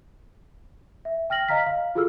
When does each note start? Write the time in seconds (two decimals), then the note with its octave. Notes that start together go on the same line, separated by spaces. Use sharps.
1.05 E5
1.30 G5 F6 A#6 F#7
1.48 D#5 F5 A#5 F6 B6
1.66 F5 F6
1.95 F4 F#4 G#4 A4 E6 F6